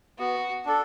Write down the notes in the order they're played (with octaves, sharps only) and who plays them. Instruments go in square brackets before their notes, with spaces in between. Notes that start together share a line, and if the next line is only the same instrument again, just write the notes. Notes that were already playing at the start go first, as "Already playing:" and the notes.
[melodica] B3 [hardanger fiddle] F#4
[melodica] D4 A4